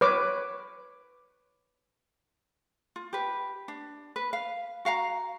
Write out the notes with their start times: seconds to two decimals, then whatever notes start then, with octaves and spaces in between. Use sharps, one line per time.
0.01 B4 C#5 D6
2.96 F4
3.13 G4 B4
3.68 D4
4.16 B4
4.33 F5
4.85 F#4 F5 F#5 A#5